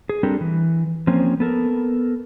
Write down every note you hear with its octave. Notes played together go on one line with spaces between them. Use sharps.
G#4
G3 C4 D4 G4 A4 A#4
E3
F3 A#3 C4 C#4
B3 A4 A#4